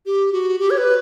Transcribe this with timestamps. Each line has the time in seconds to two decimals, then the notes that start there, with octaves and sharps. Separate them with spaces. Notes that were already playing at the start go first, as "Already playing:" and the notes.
0.06 G4
0.32 F#4
0.59 G4
0.70 C#5
0.77 B4